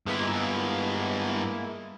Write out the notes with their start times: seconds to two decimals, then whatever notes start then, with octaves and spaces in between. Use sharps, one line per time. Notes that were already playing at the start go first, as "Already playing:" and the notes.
0.06 G2 G#3 A#3 B3 E4